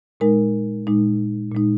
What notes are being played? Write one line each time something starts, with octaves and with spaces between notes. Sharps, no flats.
A#2 G#3 D#4 A#4
A#2 G#3 D#4
A#2 G#3 D#4